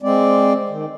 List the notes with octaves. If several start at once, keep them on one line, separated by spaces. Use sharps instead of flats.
G#3 C4 D5
D#3